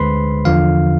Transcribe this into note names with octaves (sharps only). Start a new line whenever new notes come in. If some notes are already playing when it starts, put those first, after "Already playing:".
Already playing: D2 D3 G#3 B4 C5 B5 C6
E2 D3 F3 F4 F5